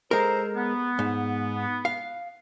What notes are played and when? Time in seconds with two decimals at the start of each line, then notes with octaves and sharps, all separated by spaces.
0.11 G#3 A4 A#4 C5 A#5
0.56 B3
0.99 G#2
1.85 F5